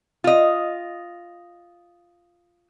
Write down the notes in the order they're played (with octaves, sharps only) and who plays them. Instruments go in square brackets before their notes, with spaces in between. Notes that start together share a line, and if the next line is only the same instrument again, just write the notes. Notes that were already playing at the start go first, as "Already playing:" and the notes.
[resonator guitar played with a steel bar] F4 D#5